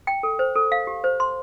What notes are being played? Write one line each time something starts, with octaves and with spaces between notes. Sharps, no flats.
G5
A4
C5
A4
F5
G4
C5
C6